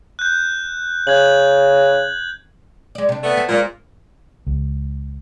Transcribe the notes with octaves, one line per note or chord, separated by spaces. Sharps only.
F#6 G6
C#3 F#6 G#6 F#7
G#3 D5
C3 D4
A3 B3
C4
A#2 G#3 A#3 C4
C#2